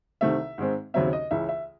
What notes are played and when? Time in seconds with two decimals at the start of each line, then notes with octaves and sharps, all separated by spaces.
0.21 C2 C3 D#3 A3 C4 E5
0.58 G#2 D#3 G#3 C4
0.94 D#2 C#3 F#3 C4 E5
1.13 D#5
1.31 C#2 C#3 E3 E5
1.49 E5